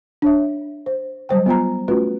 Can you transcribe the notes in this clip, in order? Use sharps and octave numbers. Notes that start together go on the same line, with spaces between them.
D4 C#5 E5
C5
F#3 G3 C5 G5
B3 F4 G5 A#5
A3 C#4 F4 F#4 B4